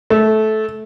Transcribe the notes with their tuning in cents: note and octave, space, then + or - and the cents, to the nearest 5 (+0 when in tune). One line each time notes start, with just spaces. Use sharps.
A3 -15